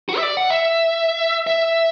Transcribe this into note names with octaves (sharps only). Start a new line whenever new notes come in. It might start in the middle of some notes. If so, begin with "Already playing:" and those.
F#4
E5
D5
F#5
E5
E5